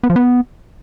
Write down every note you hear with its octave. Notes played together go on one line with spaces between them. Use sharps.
B3
F3
B3